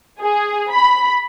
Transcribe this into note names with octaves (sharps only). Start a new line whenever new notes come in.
G#4
B5